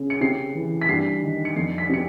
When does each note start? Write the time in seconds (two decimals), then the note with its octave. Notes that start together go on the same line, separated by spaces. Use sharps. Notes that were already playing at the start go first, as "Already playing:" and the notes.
Already playing: C#3
0.10 C#7
0.21 C3 C7
0.55 E3
0.81 B6
0.89 G2 C7
1.22 D#3
1.45 C#7
1.56 F2 C7
1.78 B6
1.89 C3 C#7